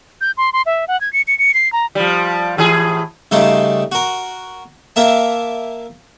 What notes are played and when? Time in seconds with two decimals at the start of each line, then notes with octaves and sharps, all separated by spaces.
0.21 G6
0.37 C6
0.53 C6
0.66 E5
0.88 F#5
1.01 G#6
1.13 C#7
1.28 C#7
1.39 C#7
1.54 C7
1.73 A#5
1.95 F3 G3
2.57 A2 E3 G#4
3.31 C#3 G3 A3 D#4 A5 C6
3.92 F#4 A#4
4.96 A#3 A#4 E5 A5